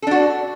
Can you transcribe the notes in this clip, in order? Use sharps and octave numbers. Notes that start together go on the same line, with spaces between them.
D4 F#4 A4